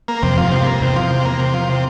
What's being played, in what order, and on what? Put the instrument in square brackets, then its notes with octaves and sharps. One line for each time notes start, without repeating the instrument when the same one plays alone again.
[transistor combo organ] A#3
[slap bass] F2 [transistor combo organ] C3
[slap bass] G2 [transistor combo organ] F3
[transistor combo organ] C3
[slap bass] G2 [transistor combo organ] A#3
[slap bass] E2 [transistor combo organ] C3
[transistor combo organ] F3
C3
A#3
C3
F3
C3